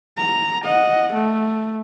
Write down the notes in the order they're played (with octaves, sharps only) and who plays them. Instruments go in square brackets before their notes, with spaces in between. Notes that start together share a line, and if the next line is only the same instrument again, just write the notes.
[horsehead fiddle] A#5
D#5 F#5
A3